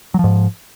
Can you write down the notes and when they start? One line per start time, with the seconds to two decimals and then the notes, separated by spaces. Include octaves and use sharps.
0.14 F#3
0.19 F3
0.24 G#2